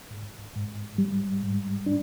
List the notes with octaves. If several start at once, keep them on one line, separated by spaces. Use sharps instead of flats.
G#2
G#2
G3
G#2
D4